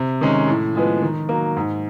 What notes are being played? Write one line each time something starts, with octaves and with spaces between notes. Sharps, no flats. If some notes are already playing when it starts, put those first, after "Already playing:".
Already playing: C3
D#3 G#3 C#4
A2
F3 G#3 B3
D#3
F#3 A#3
G#2